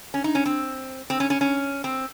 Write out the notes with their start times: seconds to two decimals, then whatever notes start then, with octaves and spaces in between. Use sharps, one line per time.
0.14 C#4
0.24 D#4
0.35 C#4
0.45 C4
1.10 C4
1.20 C#4
1.30 C#4
1.41 C#4
1.84 C4